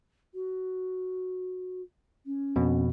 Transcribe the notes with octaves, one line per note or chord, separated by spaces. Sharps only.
F#4
C#4
F2 B2